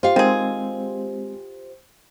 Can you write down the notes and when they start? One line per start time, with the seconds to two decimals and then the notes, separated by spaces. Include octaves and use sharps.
0.03 F4 G4 C5 F5
0.16 D#3 G#3 C4 G#4